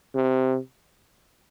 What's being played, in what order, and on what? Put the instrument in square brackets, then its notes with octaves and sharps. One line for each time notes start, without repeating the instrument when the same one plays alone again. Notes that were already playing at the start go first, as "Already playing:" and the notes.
[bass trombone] C3